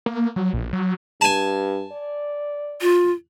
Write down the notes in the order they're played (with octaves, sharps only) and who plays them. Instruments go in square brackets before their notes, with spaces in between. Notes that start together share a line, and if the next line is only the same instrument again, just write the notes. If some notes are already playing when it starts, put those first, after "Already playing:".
[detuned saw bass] A#3
F#3
A#1
F#3
[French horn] G2 [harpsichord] G#5 A5
[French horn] D5
[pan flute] F4